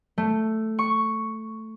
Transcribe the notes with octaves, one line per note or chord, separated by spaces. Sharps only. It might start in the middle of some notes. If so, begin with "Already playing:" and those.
A3
C#6